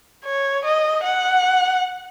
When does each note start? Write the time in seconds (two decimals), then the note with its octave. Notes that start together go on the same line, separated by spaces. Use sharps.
0.25 C#5
0.64 D#5
1.05 F#5